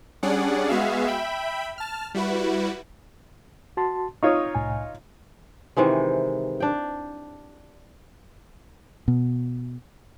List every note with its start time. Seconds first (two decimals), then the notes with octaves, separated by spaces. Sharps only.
0.23 G3 C#4 D4 G#4 D5 F#5
0.68 G#3 B3 F#4 G#4 E5 F5
1.07 E5 G5 B5
1.78 A5 F6
2.14 G3 E4 F#4 B4
3.77 F#4 A5 C6
4.23 D#4 F4 C#5 C#6 D#6
4.55 C2 A2 G#5
5.77 C3 D#3 E3 G#3
6.60 D4 G5
9.08 B2